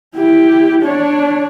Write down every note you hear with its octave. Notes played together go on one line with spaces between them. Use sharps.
E4 G4
D4 C#5